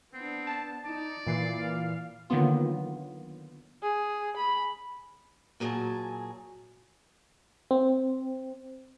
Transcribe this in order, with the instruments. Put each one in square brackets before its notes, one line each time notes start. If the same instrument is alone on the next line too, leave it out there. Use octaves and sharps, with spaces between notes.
[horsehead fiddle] B3 D4 [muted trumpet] C4
[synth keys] A5
[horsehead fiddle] D#4 [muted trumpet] D5
[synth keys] A#2 E3 C7 [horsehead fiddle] E4
[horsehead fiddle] F5
[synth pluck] D3 D#3 F#3 A#3 B3 F4
[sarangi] G#4
B5
[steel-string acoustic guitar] A#2 F#3 G#4 C#5 G#5 A5
[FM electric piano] C4